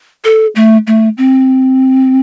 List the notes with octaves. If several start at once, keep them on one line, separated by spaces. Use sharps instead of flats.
A4
A3
A3
C4